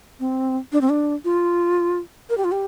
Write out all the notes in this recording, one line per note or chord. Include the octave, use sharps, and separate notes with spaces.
C4
D4
C4
D4
F4
A#4
G4
F4
G4